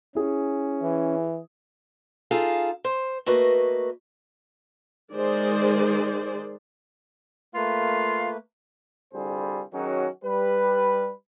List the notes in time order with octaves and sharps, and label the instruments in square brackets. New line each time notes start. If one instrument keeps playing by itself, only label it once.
[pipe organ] C#4 [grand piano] E4 G#4
[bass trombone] E3
[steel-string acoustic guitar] D#4 F4 G#4 A4 F5
C5
A3 A#3 F#4 B4 D#5
[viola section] D#3 G#3 G#4 C5 D5
[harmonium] A3 A#3 B4 [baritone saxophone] F4
[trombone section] C2 D3 G3 F4 G#4 C5
D#3 F#3 C#4 D#4 F#4 G#4
G3 B4